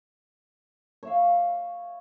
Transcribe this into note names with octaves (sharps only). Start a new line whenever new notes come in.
C#5 E5 F5